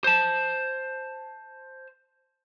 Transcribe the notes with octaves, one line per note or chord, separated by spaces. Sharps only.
C5 A5